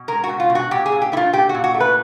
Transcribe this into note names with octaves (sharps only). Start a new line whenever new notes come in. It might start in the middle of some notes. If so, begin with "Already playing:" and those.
Already playing: B2
G#3 A#4
F#4
B2
F4
B2
F#4
A#2 G4
G#4
A#2
G4
A3 E4
F4
A#2 G4
F#4
A#2
F#4
A3
B4